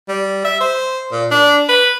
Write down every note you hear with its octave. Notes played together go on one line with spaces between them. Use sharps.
G3
E5
C5
A#2
D4
B4